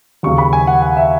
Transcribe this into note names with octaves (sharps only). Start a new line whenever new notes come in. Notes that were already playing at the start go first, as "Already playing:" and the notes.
D#2 C#3 F#3 C#6
B5
G#5
F#5
F#5
E5